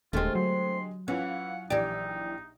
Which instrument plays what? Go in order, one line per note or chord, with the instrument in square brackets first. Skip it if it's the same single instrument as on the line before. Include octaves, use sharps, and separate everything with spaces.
[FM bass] D#1 [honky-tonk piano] D3 G#3 G4 [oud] A3 C4 [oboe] F4
[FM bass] F#3 [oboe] C6
[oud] E3 [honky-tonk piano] C#4 F4 F5 [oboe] F#5
[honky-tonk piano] A#1 G4 [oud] E3 D5 [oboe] D#4